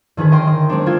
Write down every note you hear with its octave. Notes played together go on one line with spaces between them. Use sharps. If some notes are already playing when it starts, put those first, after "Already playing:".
D3 D#3 G#4 B4
A#4 D#5 G5 C6
D#5
G#3 C4 D4
G#3 F4 A4 G#6